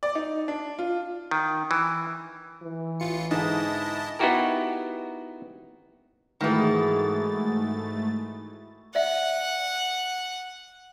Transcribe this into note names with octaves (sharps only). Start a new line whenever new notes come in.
D5
D#4
D4
F4
D#3
E3
E3
A1 F4 C#7
G#2 D3 E4 D#5 A5
B3 D#4 E4 F#4 G4 A#4
G#2 D#3 E3 A3 E4 F#4 G#4 A6
D5 E5 F#5